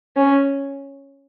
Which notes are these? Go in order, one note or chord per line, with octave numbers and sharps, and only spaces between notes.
C#4